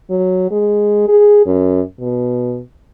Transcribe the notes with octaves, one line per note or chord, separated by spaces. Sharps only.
F#3
G#3
G#4
F#2
B2